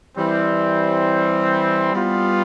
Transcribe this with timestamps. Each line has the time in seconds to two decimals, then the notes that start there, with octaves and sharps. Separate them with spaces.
0.16 E3 G3 C4
1.94 G3 B3 F4